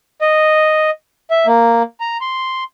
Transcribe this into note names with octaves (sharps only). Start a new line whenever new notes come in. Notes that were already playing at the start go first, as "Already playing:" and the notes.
D#5
E5
A#3
A#5
C6